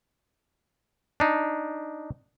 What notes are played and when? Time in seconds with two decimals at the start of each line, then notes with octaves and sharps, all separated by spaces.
1.20 D4 D#4